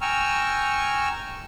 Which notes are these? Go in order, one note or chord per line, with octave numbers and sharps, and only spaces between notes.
G5 G#5 A#5 C#6 E6 F6